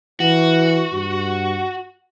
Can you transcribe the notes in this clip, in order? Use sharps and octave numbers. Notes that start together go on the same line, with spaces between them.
E3 F#4
G2